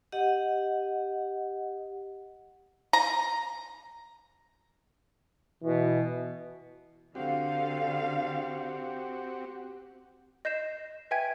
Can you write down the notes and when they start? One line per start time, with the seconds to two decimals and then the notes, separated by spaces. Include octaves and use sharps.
0.12 G4 D#5 F#5
2.93 A#5
5.63 B2 E3
7.15 D3 C4 F#4 G4 F5
10.45 D#5 G6 C7 E7
11.11 B4 E5 G5 G#5 G#6